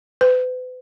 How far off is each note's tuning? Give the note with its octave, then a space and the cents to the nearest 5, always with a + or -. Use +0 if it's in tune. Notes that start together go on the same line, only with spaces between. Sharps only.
B4 +40